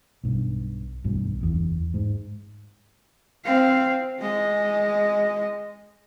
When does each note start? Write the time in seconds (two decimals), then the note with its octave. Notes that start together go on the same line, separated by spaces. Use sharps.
0.24 B1 G2
1.04 B1 G2 G3
1.41 F#1 E2
1.94 G#2
3.44 C4 F5
4.20 G#3 D#5